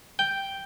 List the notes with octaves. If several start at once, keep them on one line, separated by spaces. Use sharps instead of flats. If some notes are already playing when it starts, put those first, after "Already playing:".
G5